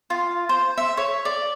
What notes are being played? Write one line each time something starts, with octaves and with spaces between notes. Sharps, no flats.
F4
C5
E5
C#5
D5